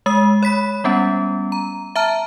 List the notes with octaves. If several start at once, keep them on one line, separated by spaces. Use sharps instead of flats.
G#3 D#6
C#5 B5 B6
G3 B3 C#4
A#5
E5 A5 A#5 F6